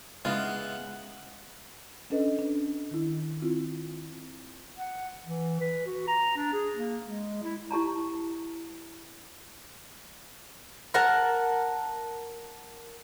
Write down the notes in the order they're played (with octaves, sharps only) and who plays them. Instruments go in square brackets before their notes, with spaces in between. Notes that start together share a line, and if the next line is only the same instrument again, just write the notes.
[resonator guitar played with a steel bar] C#3 E4 [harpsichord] G#3 B3 [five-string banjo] F4 [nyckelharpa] F#5
[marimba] C#4 D4 A4 B4 D#5
D4
D#3 E4
C4 E4 F4
[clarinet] F#5
E3
B4
F#4
A#5
D4
G#4
A#3
G#3
E4
[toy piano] E4 G4 A5 A#5
[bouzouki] A#4 F#5 A5